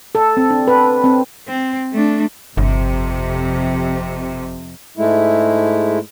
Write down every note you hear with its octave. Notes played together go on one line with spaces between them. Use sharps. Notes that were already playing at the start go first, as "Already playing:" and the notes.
A4
C4
D4
B4
C4
C4
A3 D4
G1 F2 C3
G#2 G#3 A3 E4